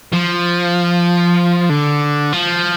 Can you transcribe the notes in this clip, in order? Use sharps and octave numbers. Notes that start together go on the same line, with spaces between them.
F3
D3
F3